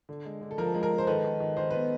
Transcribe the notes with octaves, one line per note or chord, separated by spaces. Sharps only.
D3
G#3
D3
A4
F3 A#4
G#3
A#4
G#3
C5
D#3 A4 B4
D#3
D#3
D#3 C5
B3 B4